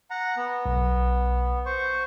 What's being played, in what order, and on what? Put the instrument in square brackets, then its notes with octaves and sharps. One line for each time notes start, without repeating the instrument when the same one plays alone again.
[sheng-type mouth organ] F#5 A#5
B3
[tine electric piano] B1
[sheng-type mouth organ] C5 C#6